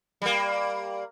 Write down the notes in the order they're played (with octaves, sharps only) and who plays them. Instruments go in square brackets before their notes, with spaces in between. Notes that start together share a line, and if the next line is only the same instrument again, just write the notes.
[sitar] G3 A#3